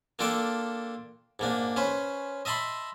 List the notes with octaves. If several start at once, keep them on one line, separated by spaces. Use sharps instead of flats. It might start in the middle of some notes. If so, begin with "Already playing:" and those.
A#3 D4 F4 A4 G5 A5
G#2 A#3 D4
C#4 B4 C5
D#5 E5 A5 B5 C6